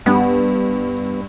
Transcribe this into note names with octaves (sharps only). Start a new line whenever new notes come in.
G2 B3